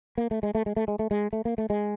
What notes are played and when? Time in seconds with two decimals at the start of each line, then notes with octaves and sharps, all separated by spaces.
0.18 A#3
0.31 A3
0.43 G#3
0.55 A3
0.66 G#3
0.76 A3
0.88 G#3
0.99 A3
1.11 G#3
1.33 A3
1.45 A#3
1.58 A3
1.70 G#3